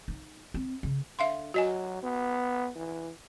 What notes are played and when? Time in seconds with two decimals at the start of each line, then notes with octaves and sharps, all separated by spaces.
0.08 D#4
0.54 C4
0.83 C#3
1.19 D3 E5 F5 C6
1.54 F#3 F#4 D#5 G#5
2.03 B3
2.76 E3